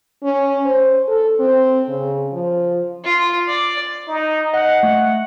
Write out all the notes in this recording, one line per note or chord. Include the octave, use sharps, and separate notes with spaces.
C#4
C5
A4
C4
C#3
F3
F4
D5
D#4
D#5 F#5
A3